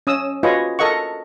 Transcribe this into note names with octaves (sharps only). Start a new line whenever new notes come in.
C#4 D#6 E6
F4 F#4 G#4 B4 C#5 D#5
A4 A#4 D#5 F#5 C#6